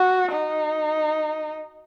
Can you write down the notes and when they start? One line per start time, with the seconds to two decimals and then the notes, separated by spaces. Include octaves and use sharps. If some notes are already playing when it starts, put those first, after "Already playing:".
Already playing: F#4
0.32 D#4